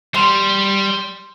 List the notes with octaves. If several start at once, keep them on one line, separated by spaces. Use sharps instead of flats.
G3 C6